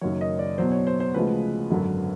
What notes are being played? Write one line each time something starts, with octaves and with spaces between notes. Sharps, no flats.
F#1 F#2 D#3 F#3 C#5
D#5
D5
E2 B2 F#3 C5
C#5
C5
C5
D2 C#3 F3 G#3 B4
G#1 F#2 D3 F#3